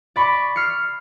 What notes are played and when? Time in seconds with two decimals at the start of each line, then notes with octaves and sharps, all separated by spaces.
0.16 D5 B5 C#6
0.56 F6 C7 C#7